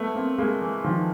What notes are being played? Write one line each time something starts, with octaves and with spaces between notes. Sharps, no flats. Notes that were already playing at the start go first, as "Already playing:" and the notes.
Already playing: A3 B3
A#3 C4
G#3 A#3
E3
D#3 F3